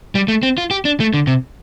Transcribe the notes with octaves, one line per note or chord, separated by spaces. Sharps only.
G3
A3
C4
F4
G4
D4
A3
D3
C3